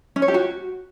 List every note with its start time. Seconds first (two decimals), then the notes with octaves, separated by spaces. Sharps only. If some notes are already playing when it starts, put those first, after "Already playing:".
0.16 C#4
0.22 C#5
0.28 G4
0.34 F#4